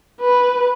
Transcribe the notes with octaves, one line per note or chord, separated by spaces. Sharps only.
B4